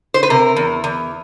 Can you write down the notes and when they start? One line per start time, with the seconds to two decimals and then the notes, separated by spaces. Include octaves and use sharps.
0.14 C5
0.23 B4
0.30 C3 A#4
0.56 E2
0.84 E2